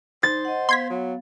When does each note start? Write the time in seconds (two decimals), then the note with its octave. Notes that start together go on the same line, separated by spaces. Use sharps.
0.23 D#4 C5 A6
0.45 D#5 F#5
0.69 B3 F5 C6 G#6 B6
0.90 F#3